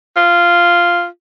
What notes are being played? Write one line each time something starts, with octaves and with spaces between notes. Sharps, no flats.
F4